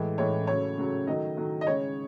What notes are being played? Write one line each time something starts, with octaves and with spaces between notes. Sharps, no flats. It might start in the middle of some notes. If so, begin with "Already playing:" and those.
Already playing: A2 E3 G#3
A2 E3 G#3 C#5
C#3 F#3 A3 C#5
C#3 F#3 A3
D#3 F#3 A3 D#5
D#3 F#3 A3
D#5
C#3 G#3 C#5